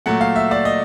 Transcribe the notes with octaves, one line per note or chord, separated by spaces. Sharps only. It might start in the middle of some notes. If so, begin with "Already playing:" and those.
A#2 F#3 A3 F#5
F5
E5
D5
D#5